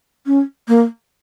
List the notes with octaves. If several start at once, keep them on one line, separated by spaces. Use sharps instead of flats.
C#4
A#3